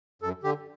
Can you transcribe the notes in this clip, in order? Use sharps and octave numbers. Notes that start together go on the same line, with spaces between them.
F#2 A4
D3 G4